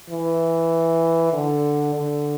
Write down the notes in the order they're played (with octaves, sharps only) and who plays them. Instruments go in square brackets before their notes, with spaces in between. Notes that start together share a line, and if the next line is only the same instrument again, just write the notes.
[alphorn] E3
D3
D3